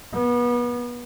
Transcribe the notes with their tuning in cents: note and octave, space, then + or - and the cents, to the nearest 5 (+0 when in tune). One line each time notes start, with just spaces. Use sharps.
B3 -30